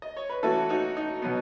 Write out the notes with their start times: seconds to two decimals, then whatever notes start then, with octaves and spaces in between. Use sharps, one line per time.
0.02 D#5
0.16 C#5
0.30 B4
0.43 E3 A3 C#4 F#4 A4
0.69 D#4 F#4
0.97 D#4
1.22 B2 F#3 B3